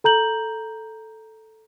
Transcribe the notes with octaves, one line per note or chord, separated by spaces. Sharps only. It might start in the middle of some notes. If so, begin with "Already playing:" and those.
A4 A#5 G6 F#7